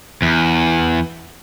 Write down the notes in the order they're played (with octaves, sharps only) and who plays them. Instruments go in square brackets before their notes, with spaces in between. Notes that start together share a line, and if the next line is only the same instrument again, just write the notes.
[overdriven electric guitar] E2